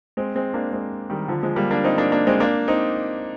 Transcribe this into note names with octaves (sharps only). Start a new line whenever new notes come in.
G#3 C4
G#3 C4
A#3 D4
G#3 C4
D#3 G3
D3 F3
F3 G#3
G3 A#3
A#3 D4
C4 D#4
A#3 D4
A#3 D4
G#3 C4
A#3 D4
C4 D#4